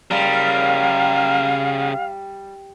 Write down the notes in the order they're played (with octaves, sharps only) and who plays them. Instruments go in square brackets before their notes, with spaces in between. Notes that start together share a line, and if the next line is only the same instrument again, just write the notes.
[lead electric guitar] C#3 A#4 [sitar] G3 [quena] F5